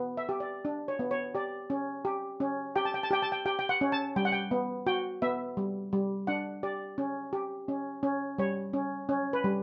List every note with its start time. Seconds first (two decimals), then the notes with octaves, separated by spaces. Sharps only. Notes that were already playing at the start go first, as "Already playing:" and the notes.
Already playing: B3
0.17 E5
0.29 G4
0.40 D5
0.65 D4
0.88 C#5
0.99 B3
1.11 C#5
1.35 G4 D5
1.70 C#4
2.05 G4
2.40 C#4
2.76 G4 G5
2.85 A5
2.94 G5
3.03 A5
3.11 G4 G5
3.22 A5
3.32 G5
3.46 G4 G5
3.59 G5
3.69 F#5
3.81 C#4
3.92 A5
4.16 G3 G5
4.25 F#5
4.32 G5
4.51 B3
4.87 F#4 G5
5.22 B3 E5
5.57 G3
5.93 G3
6.27 D4 F#5
6.63 G4 D5
6.98 C#4
7.33 G4
7.68 C#4
8.03 C#4
8.38 G3 C#5
8.73 C#4
9.09 C#4
9.33 B4
9.44 G3